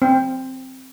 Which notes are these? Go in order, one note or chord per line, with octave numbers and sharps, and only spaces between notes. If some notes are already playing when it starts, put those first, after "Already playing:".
C4